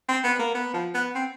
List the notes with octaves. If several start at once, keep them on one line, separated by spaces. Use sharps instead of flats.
C4
B3
A#3
B3
F3
B3
C4